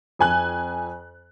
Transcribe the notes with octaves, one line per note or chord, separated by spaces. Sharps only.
F2 G#5 F#6